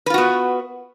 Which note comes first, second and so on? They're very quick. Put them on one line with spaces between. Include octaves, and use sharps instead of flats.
B4 F4 F#4 B3